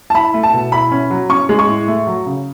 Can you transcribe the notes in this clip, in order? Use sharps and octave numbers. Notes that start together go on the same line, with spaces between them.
A5
E4 B5
A3
A5
B2
E4 B5
C#4
F#3
C#4 C#6
G#3
C#6
A2
A3
F#3
C#3